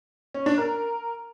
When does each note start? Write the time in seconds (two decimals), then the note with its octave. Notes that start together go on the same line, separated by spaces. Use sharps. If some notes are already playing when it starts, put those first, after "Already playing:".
0.34 C#4
0.46 D4
0.58 A#4